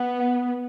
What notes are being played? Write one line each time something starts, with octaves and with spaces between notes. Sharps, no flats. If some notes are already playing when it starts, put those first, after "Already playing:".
Already playing: B3 F#5
F#5